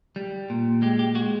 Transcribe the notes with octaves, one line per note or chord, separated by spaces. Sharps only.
G3
A#2
G#3 G4
G4
G#3 F#4